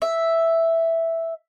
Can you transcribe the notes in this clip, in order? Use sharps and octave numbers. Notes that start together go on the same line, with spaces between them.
E5